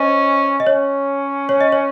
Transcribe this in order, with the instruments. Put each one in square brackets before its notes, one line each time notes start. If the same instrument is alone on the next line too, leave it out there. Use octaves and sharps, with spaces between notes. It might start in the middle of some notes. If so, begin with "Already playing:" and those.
Already playing: [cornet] C#4 [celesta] C5 D#5
[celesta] D#5
[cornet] C#4 [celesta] C#5
[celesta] C#5
D#5
C#5